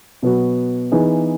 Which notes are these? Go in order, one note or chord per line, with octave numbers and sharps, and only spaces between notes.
B2 F#3 B3 F#4
E3 B3 D#4 G#4